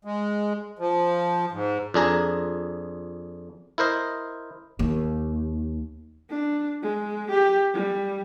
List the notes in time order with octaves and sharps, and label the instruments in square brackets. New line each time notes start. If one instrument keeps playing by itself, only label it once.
[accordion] G#3
F3
G#2
[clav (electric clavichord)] F2 D4 G#4 A#5
E4 A#4 C5 D#5
[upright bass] D#2
[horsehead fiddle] D4
G#3
G4
G3